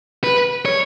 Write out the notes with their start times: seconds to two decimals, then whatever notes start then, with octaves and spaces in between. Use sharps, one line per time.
0.24 B4
0.66 C#5